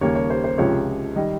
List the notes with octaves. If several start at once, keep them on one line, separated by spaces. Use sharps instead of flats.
D#2 C#3 G3 A#3 C#5
C#5
C5
C5
C#2 C3 F3 G#3 C#5
D#3 G3 D#5